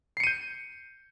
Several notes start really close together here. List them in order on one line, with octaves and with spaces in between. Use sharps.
C7 C#7 D#7 G6